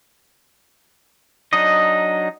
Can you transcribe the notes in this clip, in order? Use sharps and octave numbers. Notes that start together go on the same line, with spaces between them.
F#3 D4 D#4 D#5